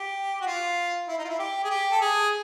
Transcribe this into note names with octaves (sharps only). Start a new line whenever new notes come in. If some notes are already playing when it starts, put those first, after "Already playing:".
Already playing: G4
F#4
F4
E4
D#4
F4
E4
G4
G#4
G4
A4
G#4